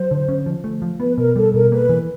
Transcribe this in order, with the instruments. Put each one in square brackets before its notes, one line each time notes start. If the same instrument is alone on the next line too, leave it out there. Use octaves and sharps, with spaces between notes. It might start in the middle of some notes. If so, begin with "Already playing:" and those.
Already playing: [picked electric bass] F#3 [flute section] C5
[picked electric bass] D3
C#4
F3
A3
F3
[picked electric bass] B3 [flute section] B4
[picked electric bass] B2 [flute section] A#4
[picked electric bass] G3 [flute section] A4
[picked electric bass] B2 [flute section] A#4
[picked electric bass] A#3 [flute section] B4
[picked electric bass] E3